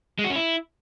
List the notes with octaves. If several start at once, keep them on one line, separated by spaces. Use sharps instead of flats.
G#3
F#4
C#4
E4